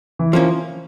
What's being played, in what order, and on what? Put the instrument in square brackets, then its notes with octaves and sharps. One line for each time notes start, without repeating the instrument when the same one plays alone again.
[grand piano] E3
[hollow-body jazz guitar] F3 A#3 C#4